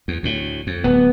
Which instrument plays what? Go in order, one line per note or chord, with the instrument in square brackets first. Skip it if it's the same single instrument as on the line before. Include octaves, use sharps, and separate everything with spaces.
[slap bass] E2
D2 A2
F2
[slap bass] D1 [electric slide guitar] B3